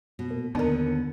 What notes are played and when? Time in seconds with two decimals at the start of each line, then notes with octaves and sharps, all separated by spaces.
0.19 B2
0.30 A#2
0.55 D#2 D3 B3 D4 D#4 A#4